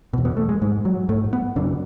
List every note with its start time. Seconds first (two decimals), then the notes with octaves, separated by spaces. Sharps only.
0.13 E2 B2
0.25 B3
0.37 A3
0.49 G#3
0.62 G#2 G#3
0.85 F#3
1.09 G#2 A3
1.33 B3
1.56 F#2 C#3 D4